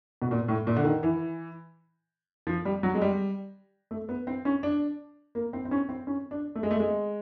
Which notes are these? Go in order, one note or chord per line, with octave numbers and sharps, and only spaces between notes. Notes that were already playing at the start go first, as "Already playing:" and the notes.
B2
A#2
A2
A#2
D3
D#3
E3
F3
G3
F#3
G#3
G3
A3
B3
C4
C#4
D4
A#3
C4
C4
C#4
C4
C#4
D4
A3
G#3
A3
G#3